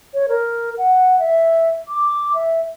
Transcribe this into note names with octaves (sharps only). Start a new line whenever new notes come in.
C#5
A#4
F#5
E5
D6
E5